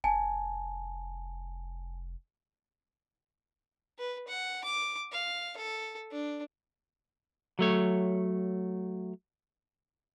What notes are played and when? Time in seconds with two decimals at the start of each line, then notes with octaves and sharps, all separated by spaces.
0.04 F1 G#5 A5
3.99 B4
4.28 F#5
4.64 D6
5.12 F5
5.57 A4
6.12 D4
7.59 F#3 A3 C#5